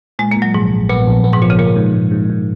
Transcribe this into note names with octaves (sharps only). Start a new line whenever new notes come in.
A#2 G#3
A#3
A#2
F#3
A#1 G#2
A#1
A#2 B3
A#1
B3
G#2
A#2 F3
C#3
A#2 A#3
G#2
G#2
G#2
G#2